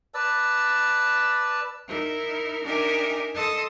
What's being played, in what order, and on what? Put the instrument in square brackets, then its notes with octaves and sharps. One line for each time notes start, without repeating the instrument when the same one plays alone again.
[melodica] B4 D5 A5 E6
[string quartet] D#4 E4 A#4
D4 D#4 G4 A#4 E5 G#5
A4 D#5 A5 C6 D#6